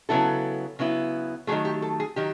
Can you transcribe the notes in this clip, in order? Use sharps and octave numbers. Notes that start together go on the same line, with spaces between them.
C#3 F#3 B3 E4 A4
C#3 F#3 B3 E4
D#3 F#3 A3 G#4
G4
A4
G#4
D#3 F#3 G4